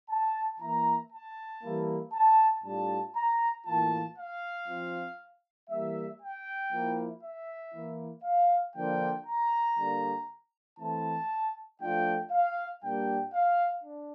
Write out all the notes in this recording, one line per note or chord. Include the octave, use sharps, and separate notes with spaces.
A5
E3 A#3 E4 A#5
A5
E3 G3 A#3 E4
A5
A2 G3 D4 F4 A5
A#5
A2 E3 A#3 F4 A5
F5
F3 C4 F4
E3 G3 A#3 E5
G5
F3 A#3 E4
E5
E3 A#3 E4
F5
D3 F3 A#3 D4 F4 G5
A#5
D3 G3 A#3
E3 A3 C4 E4 A5
F3 A3 D4 F4 G5
F5
A#2 G3 A#3 D4 G5
F5
D4